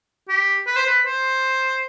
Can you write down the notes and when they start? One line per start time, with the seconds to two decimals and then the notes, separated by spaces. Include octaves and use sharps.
0.29 G4
0.67 B4
0.76 C5
0.86 B4
1.05 C5